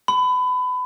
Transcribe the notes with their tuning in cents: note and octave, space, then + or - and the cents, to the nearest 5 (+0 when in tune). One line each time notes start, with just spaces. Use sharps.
B5 +25